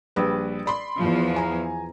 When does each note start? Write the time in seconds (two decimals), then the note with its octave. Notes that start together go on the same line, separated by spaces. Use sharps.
0.16 A#1 G3 B4
0.66 D5 B5 C6
0.97 E2 F3
1.36 G#5 A#5